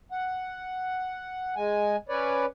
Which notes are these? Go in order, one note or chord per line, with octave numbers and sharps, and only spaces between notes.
F#5
G#3 G#5
C#4 B4 C#5 D5